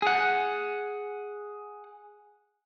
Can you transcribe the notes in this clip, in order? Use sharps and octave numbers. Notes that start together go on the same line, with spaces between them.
G#4 F#5